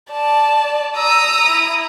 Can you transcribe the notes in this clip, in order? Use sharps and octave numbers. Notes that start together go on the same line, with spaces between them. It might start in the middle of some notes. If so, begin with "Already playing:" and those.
D5 A5
A#5 D#6 E6
E4